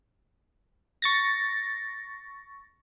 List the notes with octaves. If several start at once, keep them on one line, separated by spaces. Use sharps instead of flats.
C#6 A6 A#6